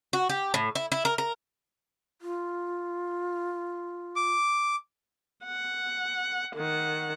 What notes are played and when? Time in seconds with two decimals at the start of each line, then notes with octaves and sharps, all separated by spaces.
0.13 F#4
0.29 G4
0.54 A2
0.75 E4
0.92 E4
1.05 A#4
1.18 A#4
2.22 F4
4.16 D6
5.44 F#5
6.56 D#3 F#5